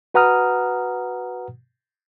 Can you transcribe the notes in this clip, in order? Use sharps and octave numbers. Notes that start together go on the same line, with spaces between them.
F#4 B4 F#5 A#5 D#6 F6